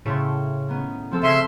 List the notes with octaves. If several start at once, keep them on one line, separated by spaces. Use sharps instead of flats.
A2 C#3 C#5 C6
D#3 B3 C#4
F3 C4 A4
C#3 E5 C6